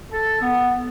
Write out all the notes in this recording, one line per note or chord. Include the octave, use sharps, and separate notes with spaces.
A4
B3